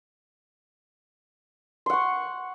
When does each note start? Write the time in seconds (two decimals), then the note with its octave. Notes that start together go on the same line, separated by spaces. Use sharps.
1.86 C6
1.90 F#5
1.93 C#6